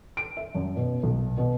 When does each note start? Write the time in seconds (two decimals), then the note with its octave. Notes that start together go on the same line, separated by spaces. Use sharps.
0.17 D7
0.37 E5
0.55 F#2
0.76 B2
1.03 B1
1.37 B2